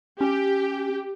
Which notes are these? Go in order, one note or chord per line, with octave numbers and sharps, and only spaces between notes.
C#4 G4